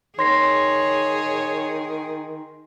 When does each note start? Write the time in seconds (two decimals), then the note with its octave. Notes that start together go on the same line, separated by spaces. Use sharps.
0.19 D#3 G#4 C#5 C6 A#6 C7